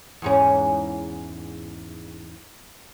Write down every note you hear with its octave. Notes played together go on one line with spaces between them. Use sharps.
E2 G#2 C#4